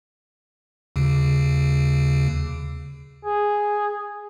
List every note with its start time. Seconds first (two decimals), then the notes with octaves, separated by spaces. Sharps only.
0.96 D#2 C#3
3.24 G#4